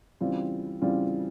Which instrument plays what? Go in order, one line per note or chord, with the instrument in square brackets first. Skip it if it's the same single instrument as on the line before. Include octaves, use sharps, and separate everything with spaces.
[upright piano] C#3 E3 G3 C4 F4
C#3 E3 G3 C4 F4